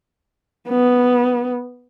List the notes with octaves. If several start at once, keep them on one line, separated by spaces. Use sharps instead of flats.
B3